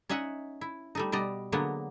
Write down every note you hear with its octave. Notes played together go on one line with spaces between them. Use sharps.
C#4 D#4 D#5 E5 F#5
E4
G3 A3 D#4
B2 G3 D5 D#5 A#5
D3 F#3 G#3 A#3 B3